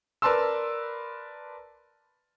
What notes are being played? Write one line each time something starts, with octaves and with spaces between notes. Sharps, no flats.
A#4 B4 D5 A5 C6 E6